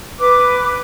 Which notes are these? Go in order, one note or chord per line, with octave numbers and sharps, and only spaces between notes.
B4 D6